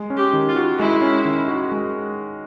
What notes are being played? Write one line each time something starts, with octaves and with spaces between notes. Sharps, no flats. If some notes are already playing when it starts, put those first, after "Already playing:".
Already playing: G#3
C#4
G4
D#3
F4
F#4
G#3 E4
C#4
D#3
F#4
G#3